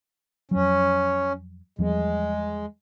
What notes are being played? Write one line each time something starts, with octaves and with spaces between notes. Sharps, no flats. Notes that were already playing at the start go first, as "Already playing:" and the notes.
F2 F#3 C#4
E2 F3 G3 G#3